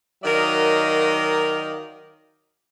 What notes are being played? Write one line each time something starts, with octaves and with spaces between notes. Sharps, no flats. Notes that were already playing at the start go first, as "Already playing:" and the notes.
D#3 F#3 A#4 D5 D#5 F5